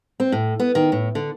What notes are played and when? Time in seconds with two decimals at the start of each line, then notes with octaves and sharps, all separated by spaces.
0.20 C4
0.32 A2
0.60 B3
0.75 D#3
0.92 A2
1.15 D3